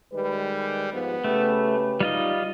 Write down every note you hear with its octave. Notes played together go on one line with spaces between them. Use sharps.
D#3 G3 G#3 B4
G#2 F3 B3
C#3 A3 G4 B4
G3 D#4 F4 D#5